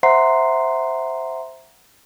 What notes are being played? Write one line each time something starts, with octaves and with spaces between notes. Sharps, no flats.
C5 E5 F#5 A#5 C6 C7